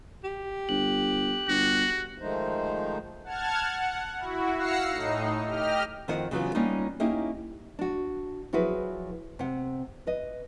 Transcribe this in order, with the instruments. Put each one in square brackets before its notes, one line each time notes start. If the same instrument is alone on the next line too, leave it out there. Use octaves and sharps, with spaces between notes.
[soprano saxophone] G4
[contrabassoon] G1 [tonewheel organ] F#6
[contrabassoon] G1 [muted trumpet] F#4
[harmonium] D#3 F3 G#3 A3 D#4 C5
[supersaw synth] F#5 A5 F6 G#6
F#5
E4 F#4
F5 F#5 E6 A#6 C7 C#7
A2 D#4
G4 D#5 F6
[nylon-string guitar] F2 D#3 F4 C5 F#5
C#3 E3 F#3 B3 F4
G3 A#3 B3 C#4 D#4 F4
A#3 C#4 D#4 E4 G4
D4 F#4
F3 F#3 E4 F#4 G#4 B4
C3 F#5
B4 D#5